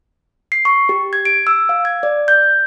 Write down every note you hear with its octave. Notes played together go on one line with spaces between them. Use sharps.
C7
C#6
G4
G#6
D7
E6
F5
G#6
D5
G6